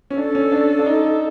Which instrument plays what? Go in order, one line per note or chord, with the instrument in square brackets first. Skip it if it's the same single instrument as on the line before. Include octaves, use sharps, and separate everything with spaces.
[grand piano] C#4
[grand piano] D4 [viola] A4
[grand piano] C#4
D4
D4
D#4